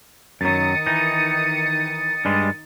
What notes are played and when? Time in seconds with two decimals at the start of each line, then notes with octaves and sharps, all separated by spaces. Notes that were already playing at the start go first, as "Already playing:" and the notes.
0.41 F#2 D#3 F#3 D#6 A6 C#7
0.86 E3 D#4
2.25 G2 G3 G#3